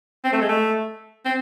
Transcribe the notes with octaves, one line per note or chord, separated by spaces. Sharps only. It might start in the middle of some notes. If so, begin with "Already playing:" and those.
C4
A3
G#3
A3
C4